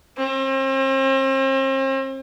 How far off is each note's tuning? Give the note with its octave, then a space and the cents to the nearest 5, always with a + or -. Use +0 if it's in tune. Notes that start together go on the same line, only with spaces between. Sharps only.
C4 +40